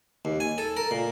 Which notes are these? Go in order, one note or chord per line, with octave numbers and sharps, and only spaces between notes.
D#2
G#5
A4
A#4
A#2